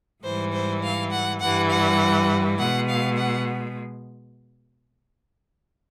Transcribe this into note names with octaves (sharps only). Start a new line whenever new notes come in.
G#2 E3 G3 C5
C5
F5
F#5
G2 E3 G3 F#5
F#5
B2 G#3 F#5
F5
F#5